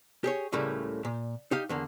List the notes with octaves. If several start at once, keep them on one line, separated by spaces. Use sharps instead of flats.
G4 G#4 C#5
C#2 A2 C#3 G3 A3 A#3
A#2
D#4 G4 F5
E2 D3 A#3